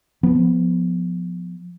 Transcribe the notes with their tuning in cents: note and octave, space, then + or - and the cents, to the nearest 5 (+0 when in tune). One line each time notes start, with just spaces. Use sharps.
F3 +20 B3 +0